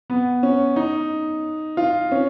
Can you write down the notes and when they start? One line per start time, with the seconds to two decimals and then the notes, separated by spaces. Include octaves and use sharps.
0.10 B3
0.43 C#4
0.76 D#4
1.77 F4
2.12 C#4